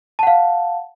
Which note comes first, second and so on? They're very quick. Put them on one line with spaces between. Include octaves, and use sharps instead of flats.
A5 F#5 F5